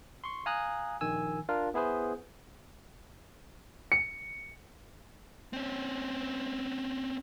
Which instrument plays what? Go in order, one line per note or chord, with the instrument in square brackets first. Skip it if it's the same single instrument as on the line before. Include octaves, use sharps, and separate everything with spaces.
[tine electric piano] C6 C#6
F5 G#5 A#5 D#6 F#6
A#1 D#3 G#5 E6
D4 F4 A#4 F5
B3 E4 G#4 B4 C5
[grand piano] C#7
[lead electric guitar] C4 C#4